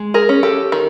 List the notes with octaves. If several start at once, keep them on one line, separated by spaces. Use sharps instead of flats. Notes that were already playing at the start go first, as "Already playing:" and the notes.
Already playing: G#3
G#4 A#4
C#4
G4 A4
D#3